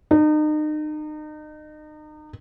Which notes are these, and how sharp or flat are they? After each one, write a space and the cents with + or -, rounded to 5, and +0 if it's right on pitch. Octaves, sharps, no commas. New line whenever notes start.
D#4 -35